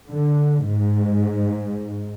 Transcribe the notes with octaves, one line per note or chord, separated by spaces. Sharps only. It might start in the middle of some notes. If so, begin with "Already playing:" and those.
D3
G#2